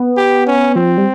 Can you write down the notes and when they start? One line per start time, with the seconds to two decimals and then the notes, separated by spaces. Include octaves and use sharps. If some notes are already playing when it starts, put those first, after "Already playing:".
Already playing: B3
0.17 G4
0.47 C#4
0.75 F3 C4
0.98 G3